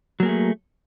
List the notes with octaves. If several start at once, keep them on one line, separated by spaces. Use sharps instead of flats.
F#3 A3 A#3 G#4